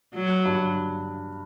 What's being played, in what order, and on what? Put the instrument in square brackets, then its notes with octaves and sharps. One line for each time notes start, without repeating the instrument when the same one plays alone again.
[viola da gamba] F#3
[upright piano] G2